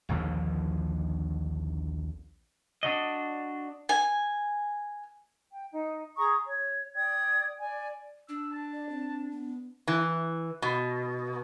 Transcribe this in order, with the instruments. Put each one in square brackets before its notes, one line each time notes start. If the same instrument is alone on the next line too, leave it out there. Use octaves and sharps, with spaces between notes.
[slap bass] A#1 D#2 D3 F3
[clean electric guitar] D4 F#4 D#5
[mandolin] G#5
[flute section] G5
D#4
G#4 A#5 C#6 D#6
C#5
D5 G5 D#6 G#6
D5 G#5
[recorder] D4 [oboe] E6
[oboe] A5
[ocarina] D5
C4
B3
[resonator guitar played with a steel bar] E3
B2